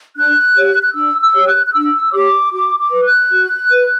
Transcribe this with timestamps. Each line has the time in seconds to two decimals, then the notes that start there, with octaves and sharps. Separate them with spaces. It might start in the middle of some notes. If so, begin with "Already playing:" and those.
0.16 D4 F#6
0.55 G4 C#5
0.82 F#6
0.94 D4 E6
1.20 E6
1.34 G4 C#5
1.48 F#6
1.66 F#6
1.74 D4 E6
2.13 G4 C#5 D6
2.52 F#4 D6
2.79 D6
2.91 B4
3.04 F#6
3.31 F#4
3.70 B4